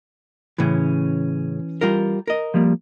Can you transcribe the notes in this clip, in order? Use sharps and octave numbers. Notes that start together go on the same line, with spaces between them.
A2 C#3 E3 C#4
G3 F4 A#4
A#4 D#5
F3 G3 A#3